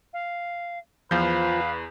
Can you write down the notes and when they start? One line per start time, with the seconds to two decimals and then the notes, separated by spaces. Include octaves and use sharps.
0.13 F5
1.11 E2 F3 B4 F5 G6